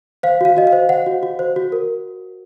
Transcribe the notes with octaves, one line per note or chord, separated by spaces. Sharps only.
C5 F5
F#4 F5
F#4 D#5
F5
C5
C5 F#5
F#4
F#4
C5
F#4
A#4